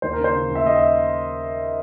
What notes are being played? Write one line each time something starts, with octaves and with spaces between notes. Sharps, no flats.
D#2 C5
A#4
C#3
C5
C#3
D#2
E5
D#2 D#5
E5